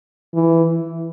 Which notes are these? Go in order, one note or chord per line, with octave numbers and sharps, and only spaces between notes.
E3